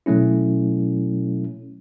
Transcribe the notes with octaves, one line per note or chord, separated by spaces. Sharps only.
B2 F#3 A3 C#4 E4